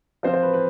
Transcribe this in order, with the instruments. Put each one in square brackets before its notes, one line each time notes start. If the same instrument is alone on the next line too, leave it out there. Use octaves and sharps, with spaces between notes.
[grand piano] F3 C4 F4 [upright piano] C5
[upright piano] C5
B4
B4